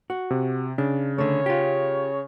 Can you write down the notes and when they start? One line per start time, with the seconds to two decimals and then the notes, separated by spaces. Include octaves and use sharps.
0.10 F#4
0.31 C3
0.78 C#3 D4
1.18 D3 A3 C#5
1.46 F4 G4